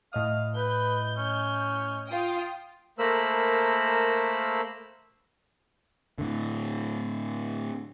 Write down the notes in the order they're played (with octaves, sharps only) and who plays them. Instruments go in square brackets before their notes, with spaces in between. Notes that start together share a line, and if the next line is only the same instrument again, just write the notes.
[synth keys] A2 D#5 D#6 [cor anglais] F5
[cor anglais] B4 [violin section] G6
[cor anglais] C#4
[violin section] F4 G5 D#6
[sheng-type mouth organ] A3 A#3 A#4 C5 B5 E6
[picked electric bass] A2 D3